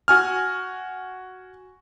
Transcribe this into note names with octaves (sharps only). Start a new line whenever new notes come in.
F#4 G#5 F6